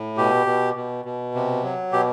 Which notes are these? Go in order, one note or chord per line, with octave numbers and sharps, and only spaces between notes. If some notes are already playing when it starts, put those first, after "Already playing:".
Already playing: A2
B2 G4
B2
B2
B2
C3
F#3
B2 G4